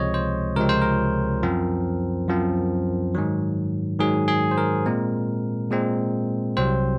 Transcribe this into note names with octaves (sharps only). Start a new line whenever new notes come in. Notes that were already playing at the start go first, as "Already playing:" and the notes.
Already playing: C#2 C3 F3 G#3 C4 C#5 D#5
C5
C#2 C3 F3 G#3 C4 A#4
C5
A#4
F#2 F3 C4
F#2 F3 C4
G#2 D#3 F#3
G#2 D#3 F#3 G#4
G#4
C5
A#4
A#2 G#3 C4
A#2 G#3 C4
C2 C3 F#3 C4 C5